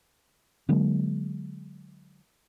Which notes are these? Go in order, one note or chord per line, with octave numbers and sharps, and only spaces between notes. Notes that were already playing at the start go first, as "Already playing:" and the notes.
D3 F#3 G#3 A#3